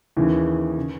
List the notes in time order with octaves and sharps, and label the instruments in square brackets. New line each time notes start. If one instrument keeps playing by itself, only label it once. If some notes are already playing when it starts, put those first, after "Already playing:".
[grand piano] D#2 C#3 E3
C#3